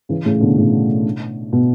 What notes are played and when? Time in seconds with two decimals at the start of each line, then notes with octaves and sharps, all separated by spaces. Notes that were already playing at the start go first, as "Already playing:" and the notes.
0.09 C#3 E3
0.25 A2 C#3
0.41 B2 D3
0.57 A2 C#3
1.53 B2